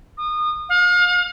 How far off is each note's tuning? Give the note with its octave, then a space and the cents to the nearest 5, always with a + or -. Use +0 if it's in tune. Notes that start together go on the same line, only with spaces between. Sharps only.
D#6 -30
F5 +40